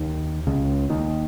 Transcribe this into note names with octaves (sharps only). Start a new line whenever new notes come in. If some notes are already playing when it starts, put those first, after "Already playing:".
Already playing: D#2 D#3
C#2 C#3
D#2 D#3